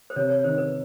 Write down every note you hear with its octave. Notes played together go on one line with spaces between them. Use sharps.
C5
C3 C#5
C#5
D#3 C5
B4